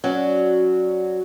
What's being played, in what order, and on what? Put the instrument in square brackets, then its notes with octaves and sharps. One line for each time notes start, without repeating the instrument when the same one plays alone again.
[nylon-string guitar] F#3 [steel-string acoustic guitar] C#4 F#4 D5